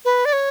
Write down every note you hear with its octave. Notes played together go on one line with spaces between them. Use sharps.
B4
D5
C#5